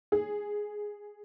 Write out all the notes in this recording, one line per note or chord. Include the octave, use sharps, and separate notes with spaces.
G#4